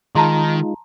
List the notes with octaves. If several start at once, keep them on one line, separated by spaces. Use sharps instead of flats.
D#3 G#3 D#4 F4 A5 A#5 C6